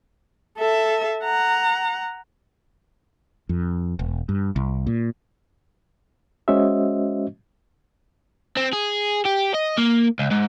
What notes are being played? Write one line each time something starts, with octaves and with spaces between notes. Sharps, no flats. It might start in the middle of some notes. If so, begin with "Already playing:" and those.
A4 E5
F#5 A#5
F2
E1
G2
C2
A#2
G#3 C#4 F#4 C5 D#5 E5
C4
G#4
G4
D#5
A#3
C#2
G#2